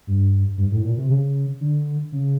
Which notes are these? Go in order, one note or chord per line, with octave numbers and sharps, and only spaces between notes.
G2
G2
A2
A#2
C3
C#3
D3
C#3